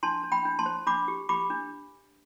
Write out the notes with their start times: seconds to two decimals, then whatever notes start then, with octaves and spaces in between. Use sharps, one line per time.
0.03 D4 A5 C6
0.24 D4
0.32 G5 B5
0.45 D4
0.59 A5 C6
0.66 C5
0.87 D4 B5 D6
1.08 G4
1.29 G4 B5 D6
1.50 D4